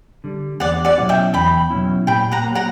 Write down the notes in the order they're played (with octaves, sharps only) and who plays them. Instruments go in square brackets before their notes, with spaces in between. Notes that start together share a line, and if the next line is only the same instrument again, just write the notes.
[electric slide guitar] D3 G3
[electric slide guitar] E2 [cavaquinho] D5 F#5
[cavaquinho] D5 F#5
[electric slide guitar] B2 F#3 C#4 E4
[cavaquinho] E5 G5
[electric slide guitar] E2 [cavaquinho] G5 B5
[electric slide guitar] B2 F#3 C#4 E4
[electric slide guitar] A#2 [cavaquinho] G5 B5
[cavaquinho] F#5 A#5
[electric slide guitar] F#3 A#3
[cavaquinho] F#5 A#5